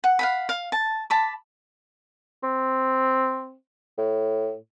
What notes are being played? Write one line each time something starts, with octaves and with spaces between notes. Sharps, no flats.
F#5
F5 F#5 B5
F5
A5
A5 B5 D6
C4
A2